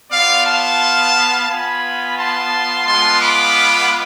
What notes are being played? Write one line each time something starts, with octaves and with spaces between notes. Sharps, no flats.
B3 F4 D5 F5
F5 A5
B3 F4 G#5 B5
A5 C6
G#3 B3 F4 A5 C6
B5 D6